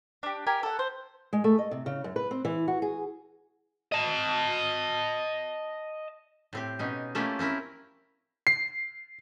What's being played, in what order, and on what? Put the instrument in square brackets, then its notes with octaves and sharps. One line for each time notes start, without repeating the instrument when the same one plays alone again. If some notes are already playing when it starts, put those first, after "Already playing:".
[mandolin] D4 G4
G4 A#4 G#5
A4 F#5
C5
[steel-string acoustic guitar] G#3
A3
D#5
C3
C#3
F#2
B4
C4
E3
F#4
G#4
[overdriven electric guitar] D#5 A5
[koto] A2 C4 G4
B2 C#4 D#4
A3 A#3 C#4 E4 F4 G4
C4 C#4 E4 A#4
[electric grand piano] C7